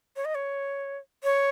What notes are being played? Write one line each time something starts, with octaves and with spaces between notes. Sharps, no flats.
C#5
D#5
C#5
C#5